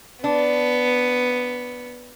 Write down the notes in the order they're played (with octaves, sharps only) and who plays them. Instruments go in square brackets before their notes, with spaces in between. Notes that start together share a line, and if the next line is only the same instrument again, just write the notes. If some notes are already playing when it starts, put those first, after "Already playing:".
[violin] B3 [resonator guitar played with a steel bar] D4